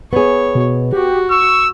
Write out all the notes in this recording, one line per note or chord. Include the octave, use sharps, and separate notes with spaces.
B3 G#4 C#5
B2
F#4 G4
C#6 E6